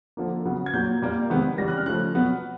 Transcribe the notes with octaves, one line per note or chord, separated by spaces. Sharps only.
D3 F3 A#3
C#3 F#3 B3
G#6
A#2 F#3 A#3 G6
A#2 G3 A#3
C3 D#3 G#3 B3
C#3 E3 G3 A#6
F#6
F6
C#3 F3 A3 F#6
B2 F#3 B3